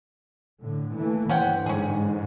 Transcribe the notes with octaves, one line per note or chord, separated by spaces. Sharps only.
A2 D3
E3 A3 A#3
G2 D3 E3 C#4 C5 F#5 G5
G#2 C#4 G#4